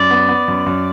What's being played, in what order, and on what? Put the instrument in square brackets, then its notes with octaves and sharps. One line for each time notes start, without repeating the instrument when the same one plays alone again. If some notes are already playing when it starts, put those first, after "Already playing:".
Already playing: [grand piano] F#2 [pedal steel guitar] D5
[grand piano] B3
B3
F#2
F#2